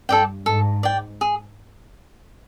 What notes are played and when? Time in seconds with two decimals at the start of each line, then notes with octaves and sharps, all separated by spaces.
0.09 G2 A4 D5 G5
0.46 G#2 A4
0.83 D5 G5
1.21 G#4